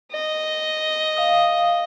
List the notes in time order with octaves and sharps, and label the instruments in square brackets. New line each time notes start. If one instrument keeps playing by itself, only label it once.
[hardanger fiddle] D#5
[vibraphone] F5 D#6